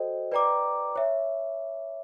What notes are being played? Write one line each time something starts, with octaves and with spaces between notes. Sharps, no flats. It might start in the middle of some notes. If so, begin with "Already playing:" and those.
Already playing: F#4 A4 C5 D#5 G5
B4 D5 G5 A#5 D6
C#5 E5